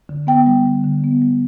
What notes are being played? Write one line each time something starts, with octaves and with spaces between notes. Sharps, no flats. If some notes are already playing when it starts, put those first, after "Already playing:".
D3
B3 G5
G3
D3
D3
B3
G3